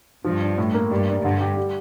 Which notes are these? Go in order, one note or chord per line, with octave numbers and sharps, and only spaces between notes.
G2 F3
D4
A2
A#3
G2 G3
D4
G2 D3
G4
G3